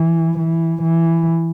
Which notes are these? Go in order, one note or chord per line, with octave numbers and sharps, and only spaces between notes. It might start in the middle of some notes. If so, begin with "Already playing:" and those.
Already playing: E3
E3
E3